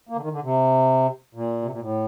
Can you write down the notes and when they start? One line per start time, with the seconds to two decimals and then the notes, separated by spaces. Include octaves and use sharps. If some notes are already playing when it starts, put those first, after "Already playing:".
0.09 A#3
0.16 D3
0.21 D#3
0.32 D3
0.43 C3
1.35 A#2
1.62 C3
1.71 A#2
1.80 A2